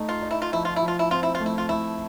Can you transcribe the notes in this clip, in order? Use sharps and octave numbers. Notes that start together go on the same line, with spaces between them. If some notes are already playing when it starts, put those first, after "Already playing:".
Already playing: A3 D#4
F4
D#4
E4
F4
F3 E4
F4
E4
F3
F4
E4
C4 F4
E4
F4
A3
E4
F4
A3 E4